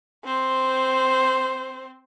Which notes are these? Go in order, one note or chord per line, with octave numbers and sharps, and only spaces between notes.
C4 C5